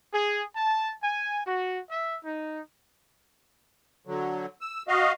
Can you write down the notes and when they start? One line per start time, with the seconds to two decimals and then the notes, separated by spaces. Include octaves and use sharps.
0.12 G#4
0.55 A5
1.01 G#5
1.46 F#4
1.89 E5
2.24 D#4
4.07 D3 F#3
4.61 E6
4.88 F#4 D#5 F5